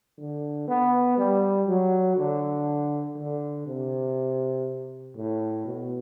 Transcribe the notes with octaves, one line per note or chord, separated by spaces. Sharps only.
D3
B3
G3
F#3
D3
D3
C3
A2
B2